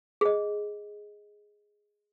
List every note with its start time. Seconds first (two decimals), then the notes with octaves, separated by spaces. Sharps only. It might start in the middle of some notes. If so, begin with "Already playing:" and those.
0.21 G#4 D#5